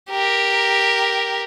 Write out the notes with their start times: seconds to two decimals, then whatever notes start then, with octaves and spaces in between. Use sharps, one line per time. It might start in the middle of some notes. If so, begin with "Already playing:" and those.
0.10 G4 A#4